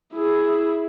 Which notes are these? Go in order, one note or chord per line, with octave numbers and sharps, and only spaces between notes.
E4 G#4